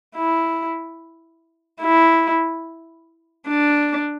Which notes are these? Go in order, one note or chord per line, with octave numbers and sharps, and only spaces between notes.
E4
E4
D4